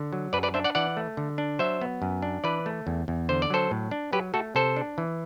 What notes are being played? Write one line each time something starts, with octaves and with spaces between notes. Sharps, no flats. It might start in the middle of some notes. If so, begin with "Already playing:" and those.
Already playing: D3
F#3
F#2 B4 D5
B4 D5
D4 C5 E5
D5 F#5
E3 D5 F#5
A3
D3
D4
F#3 C5 E5
B3
F#2
D4
E3 B4 D5
A3
E2
E2
D3 C5
D5
F#3 A4 C5
A2
D4
F#3 G4 B4
A3 F#4 A4
C3 A4 C5
D4
E3